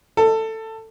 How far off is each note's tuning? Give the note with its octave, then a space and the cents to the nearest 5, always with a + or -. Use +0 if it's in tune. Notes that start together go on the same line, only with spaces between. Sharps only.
A4 +15